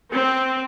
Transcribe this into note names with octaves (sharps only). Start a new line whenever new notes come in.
C4